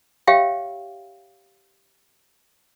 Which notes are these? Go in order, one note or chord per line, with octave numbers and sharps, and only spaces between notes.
G4 C#5 E5 F5 G5